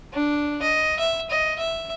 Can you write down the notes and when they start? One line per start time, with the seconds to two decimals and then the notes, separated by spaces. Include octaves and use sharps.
0.14 D4
0.62 D#5
0.99 E5
1.30 D#5
1.59 E5